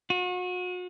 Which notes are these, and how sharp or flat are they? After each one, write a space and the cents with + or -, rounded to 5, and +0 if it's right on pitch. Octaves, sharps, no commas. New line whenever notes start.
F#4 -40